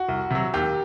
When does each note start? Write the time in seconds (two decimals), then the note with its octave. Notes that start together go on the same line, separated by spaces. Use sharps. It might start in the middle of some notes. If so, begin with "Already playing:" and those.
Already playing: F#4
0.08 C2
0.31 C3 F#3
0.54 D#2 G4